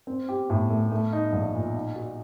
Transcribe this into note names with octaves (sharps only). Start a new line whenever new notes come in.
C4
G4
A2
A3
A3
D#4
A#1
A#2
D#4
F#4